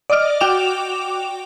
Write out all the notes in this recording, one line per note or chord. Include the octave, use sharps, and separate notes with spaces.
D5 D#5 D6 F6
F#4 G5 D6 E7 F7